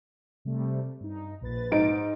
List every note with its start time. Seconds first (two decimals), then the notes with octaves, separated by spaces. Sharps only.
0.45 C3 G3 A3
1.00 G2 D#4
1.41 A#1 B4 A6
1.72 G#2 D#4 D7